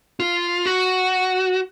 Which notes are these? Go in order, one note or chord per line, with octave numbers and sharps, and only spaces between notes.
F4
F#4